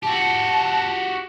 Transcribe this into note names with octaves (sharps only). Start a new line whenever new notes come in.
F#4 G4 A5